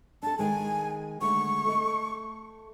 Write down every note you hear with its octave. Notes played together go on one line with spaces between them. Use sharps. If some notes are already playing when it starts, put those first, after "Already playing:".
D4 A4 A5
D#3 G#3 G#5
D3 G#3 A3 C#6
A3 A4 D#5